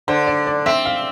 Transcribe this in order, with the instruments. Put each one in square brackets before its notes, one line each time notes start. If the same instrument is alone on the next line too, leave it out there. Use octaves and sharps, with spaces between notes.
[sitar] D3 [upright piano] C5
[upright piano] D5
D5
[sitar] C4 [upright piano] E5
[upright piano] F5